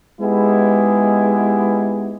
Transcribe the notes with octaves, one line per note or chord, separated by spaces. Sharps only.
G#3 B3 D#4 E4 G4 G#4